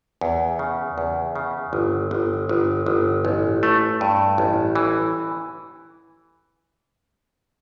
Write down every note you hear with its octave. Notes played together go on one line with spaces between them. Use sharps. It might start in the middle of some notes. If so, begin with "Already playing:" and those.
E2
C#3
E2
C#3
G1
G1
G1
G1
A1
A3
G2
A1
E3